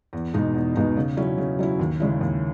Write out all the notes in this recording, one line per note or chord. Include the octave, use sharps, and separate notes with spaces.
E2
B2 G#3 D#4
E2
B2 G#3 D#4
C#3
F#3 C#4 E4
C#3
F#3 C#4 E4
D#2
C#3 G#3 C#4 E4
D#2